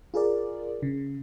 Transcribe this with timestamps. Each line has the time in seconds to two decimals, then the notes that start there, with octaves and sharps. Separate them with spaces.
0.14 F4 G#4 A#4 D5
0.83 C#3